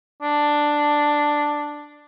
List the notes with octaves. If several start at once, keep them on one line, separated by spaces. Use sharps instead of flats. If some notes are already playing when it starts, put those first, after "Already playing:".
D4